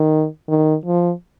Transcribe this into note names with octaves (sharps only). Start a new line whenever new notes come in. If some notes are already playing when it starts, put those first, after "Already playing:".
Already playing: D#3
D#3
F3